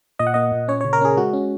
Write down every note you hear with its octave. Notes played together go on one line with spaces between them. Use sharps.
A#2 D#5
F#5
A#3 D#5
A#2
C#4 C#5
C#5
C#3
A#4
C#4 G#4
G#3 F#4
C#4